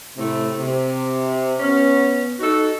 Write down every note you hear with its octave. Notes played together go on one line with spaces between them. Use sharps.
A2 C3 A3
C3
B3 C#4
D#4 F#4 A4